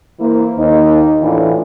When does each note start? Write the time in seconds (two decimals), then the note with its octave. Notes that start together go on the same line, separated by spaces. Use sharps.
0.20 E3 A#3 E4 C5
0.57 D#2 D#4
1.22 A2 E3 D4 F4